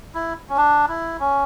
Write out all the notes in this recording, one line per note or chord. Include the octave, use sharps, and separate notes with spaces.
E4
C#4
D4
E4
C#4